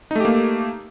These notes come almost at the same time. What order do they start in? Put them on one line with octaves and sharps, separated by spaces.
D#4 A3 G4 A#3